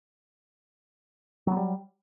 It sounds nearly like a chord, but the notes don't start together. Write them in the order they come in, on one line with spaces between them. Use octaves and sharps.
F#3 B3 G3